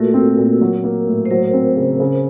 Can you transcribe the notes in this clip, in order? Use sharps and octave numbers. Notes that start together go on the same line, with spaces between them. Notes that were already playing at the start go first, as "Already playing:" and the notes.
Already playing: A#2 A3 F#4 A4 A#4
C4
A#2
F#3
A#3
A2
C5
F#3 A#4
C4
C#3
C#3